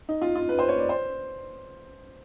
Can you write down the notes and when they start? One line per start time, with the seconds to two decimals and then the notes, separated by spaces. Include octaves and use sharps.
0.09 D#4
0.22 F4
0.35 F4
0.49 B4
0.59 C5
0.68 C#5
0.78 D5
0.89 C5